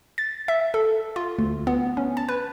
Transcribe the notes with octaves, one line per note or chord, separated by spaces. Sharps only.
A6
E5
A4
F4
D2
B3
C#4
A5
B4